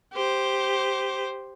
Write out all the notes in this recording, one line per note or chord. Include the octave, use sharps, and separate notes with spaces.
G4 C5